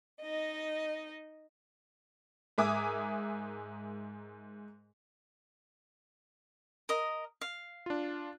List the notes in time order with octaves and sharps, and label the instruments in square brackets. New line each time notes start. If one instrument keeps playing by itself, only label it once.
[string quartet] D#4 D#5
[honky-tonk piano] G#2 A#4 E5 G#5 D6 D#6
[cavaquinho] A#4 D#5
F5
[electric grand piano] D4 F4